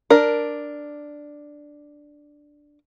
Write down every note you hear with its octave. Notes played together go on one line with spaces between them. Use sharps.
D4 A#4